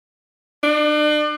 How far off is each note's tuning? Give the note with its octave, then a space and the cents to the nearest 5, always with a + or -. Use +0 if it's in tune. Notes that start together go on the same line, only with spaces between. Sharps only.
D4 +40